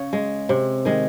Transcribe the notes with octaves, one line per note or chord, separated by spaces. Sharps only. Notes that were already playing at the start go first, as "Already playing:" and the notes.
Already playing: C#3 C#5
G#3
C3
D#3 G#3